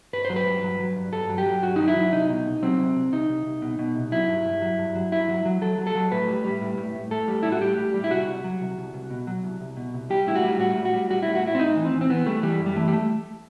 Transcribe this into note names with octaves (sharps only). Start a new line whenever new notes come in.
G2 B4
F#3 C5
B4
G2
F#3
F#3
G2
G2 A4
F#3
G4
F#3
G2 F#4
F#3 D#4
E4
F#3
C2 D#4
B2
C2
F#3 C4
C2
C2
C2 D#4
C2
C2
B2
B2
C2
F#3 E4
G2
G2
F#3
G2
F#3
G2 E4
F#3
F#3
F#3 A4
F#3
A4
F#3
A2 B4
G3
G3
A2
A2
A2
A2 A4
G3
G3 E4
F#4
A2 G4
G3
G3
E4
C2 F#4
C2
F#3
C2
C2
C2
B2
F#3
C2
C2
B2
C2
G3 G4
A2 E4
F#4
G3
A2 F#4
A2
F#4
G3
G3 F#4
A2 E4
F#4
A2 E4
C4
A2 D#4
E3
C4
E3
C4
E3 B3
G3 A3
E3 G3
F#2
G3
E3 A3
G3
A3